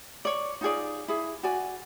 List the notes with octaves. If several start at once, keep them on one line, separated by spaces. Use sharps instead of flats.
C#5 D5
D#4 F4 G#4 D5
E4 G#4
F#4 D5 G#5